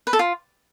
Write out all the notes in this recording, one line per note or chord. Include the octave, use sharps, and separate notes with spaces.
B4
A4
F4